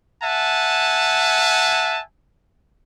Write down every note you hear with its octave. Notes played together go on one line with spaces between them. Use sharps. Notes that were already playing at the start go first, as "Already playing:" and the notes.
E5 F#5 G#5 A5